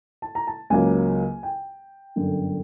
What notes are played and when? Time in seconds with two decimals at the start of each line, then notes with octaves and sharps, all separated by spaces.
0.22 A5
0.35 A#5
0.47 A5
0.70 C#2 C#3 F#3 A#3 C#4 G#5
1.43 G5
2.16 G1 F#2 D3